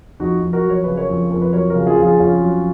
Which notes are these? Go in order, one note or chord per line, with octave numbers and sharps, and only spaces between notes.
F2 D#4 F#4
F2
F#4 A#4
F#3
C#5
C#3 B4
A#4 C#5
F2
F2 A#4
B4
F#3 A#4 C#5
F#4 A#4
C#3
F4 G#4
F2
F4 G#4
F2 C#4 F4
F#3